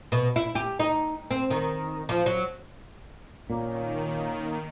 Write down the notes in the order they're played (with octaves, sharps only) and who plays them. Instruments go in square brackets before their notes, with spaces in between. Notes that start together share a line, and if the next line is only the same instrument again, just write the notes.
[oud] B2
E4
G4
D#4
C4
D#3
F3
F#3
[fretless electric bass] A#2 [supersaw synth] D#3 [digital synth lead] A#3 [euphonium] C#4